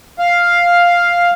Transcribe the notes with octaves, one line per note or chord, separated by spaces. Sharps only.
F5